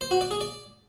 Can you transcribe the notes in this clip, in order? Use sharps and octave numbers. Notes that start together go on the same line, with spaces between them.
C5
F#4
D5
G#4
D5